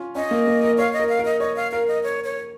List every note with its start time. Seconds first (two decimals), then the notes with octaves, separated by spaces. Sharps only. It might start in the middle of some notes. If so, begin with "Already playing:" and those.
Already playing: C#4 F4
0.15 C#4 D#5
0.31 A#3
0.47 A#3
0.63 A#4
0.78 C#5 F5
0.93 D#5
1.00 A#4
1.09 F5
1.19 A#4
1.25 D#5
1.40 C#5 D#5
1.56 F5
1.72 A#4 F5
1.88 D#5
2.03 C#5
2.24 C#5